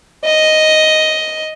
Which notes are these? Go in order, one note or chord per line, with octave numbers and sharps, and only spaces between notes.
D#5